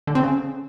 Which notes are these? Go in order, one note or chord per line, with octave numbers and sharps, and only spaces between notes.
D3
C4
C#3